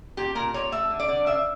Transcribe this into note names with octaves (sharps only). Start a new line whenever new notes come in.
A#2 G4
A#2 A#4
A#2 C#5
A3 E5
D3
D5
D3
C#3 E5